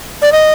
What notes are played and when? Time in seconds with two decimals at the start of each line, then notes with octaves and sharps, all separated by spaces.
0.22 D5
0.32 D#5